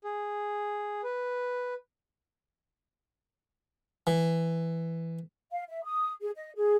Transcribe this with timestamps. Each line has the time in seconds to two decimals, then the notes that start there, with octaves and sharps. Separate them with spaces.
0.04 G#4
1.04 B4
4.07 E3
5.52 F5
5.68 E5
5.84 D#6
6.21 G#4
6.36 D#5
6.56 G#4